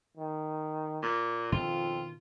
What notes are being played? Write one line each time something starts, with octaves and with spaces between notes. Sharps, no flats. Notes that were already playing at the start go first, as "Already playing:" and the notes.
D#3
A#2
F2 B2 D#3 D4 F4